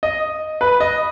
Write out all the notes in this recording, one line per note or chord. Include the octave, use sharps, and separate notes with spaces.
D#5
B4
D#5